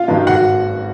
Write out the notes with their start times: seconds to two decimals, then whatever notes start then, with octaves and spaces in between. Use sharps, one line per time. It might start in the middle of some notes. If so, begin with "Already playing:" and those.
Already playing: F4 F5
0.08 G2 D#3 F#3
0.27 G#1 F#4 F#5